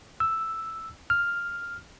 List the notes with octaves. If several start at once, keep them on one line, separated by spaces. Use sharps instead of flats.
E6
F6